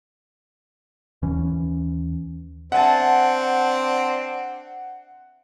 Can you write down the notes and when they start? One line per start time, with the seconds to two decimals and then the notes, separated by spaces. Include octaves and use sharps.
1.22 D#2 E3 C#4
2.72 C4 D4 E5 F#5 G#5 A5